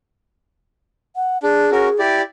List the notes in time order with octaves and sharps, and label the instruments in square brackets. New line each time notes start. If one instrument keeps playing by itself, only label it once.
[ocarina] F#5
[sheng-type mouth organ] D4 [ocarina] G#4
[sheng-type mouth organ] C#4 F#4 A#4
E4 G4 D5